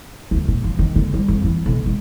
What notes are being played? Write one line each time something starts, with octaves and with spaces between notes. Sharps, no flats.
D2
A#2
F3
D#3
D3
G3
F2
E3
B1
G#3